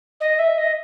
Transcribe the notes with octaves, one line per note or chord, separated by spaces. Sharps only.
D#5
E5
D#5